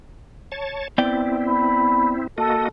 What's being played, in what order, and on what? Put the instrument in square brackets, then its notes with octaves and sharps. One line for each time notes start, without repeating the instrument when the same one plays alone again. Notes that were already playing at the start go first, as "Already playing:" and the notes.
[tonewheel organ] C#5 A5
[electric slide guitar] B3 D5 G5 [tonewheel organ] C4 E4
[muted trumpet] B5
[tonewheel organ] A#3 F#4 D#5 [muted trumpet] A4